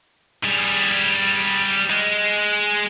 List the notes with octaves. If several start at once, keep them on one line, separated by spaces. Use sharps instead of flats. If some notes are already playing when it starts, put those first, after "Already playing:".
G3 G#4
G#3